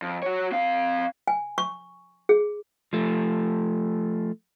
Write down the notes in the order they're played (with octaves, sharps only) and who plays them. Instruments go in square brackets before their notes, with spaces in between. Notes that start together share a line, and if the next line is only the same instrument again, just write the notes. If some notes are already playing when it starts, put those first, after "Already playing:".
[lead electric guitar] F2
F#4 C#5
C4 F5
[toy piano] G#5
C#6
G#4
[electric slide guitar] F3 A3